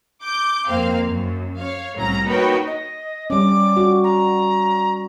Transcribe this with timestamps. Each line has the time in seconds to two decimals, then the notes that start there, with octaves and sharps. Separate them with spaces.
0.23 D6 G6
0.68 F2 A#3 C4 F5
1.09 F#2
1.57 C#5 F5
1.97 C2 A2 F#3 C#4 A#5 A#6
2.26 A#3 D#4 F#4 B4 C#5 G5
2.67 D#5
3.30 G3 C#4 D6
3.77 F#4
4.04 A#5